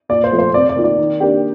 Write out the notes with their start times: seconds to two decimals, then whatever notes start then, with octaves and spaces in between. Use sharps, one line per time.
0.09 A#2 D5
0.24 C5
0.31 F3 A3
0.38 C5
0.54 C3 D5
0.69 D5
0.76 D#3 A#3 F4
0.84 D5
0.98 D#3
1.20 A#3 D4 G4